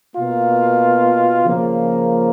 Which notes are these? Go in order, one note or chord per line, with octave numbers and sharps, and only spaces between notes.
B2 A#3 F4
C#3 F3 A#3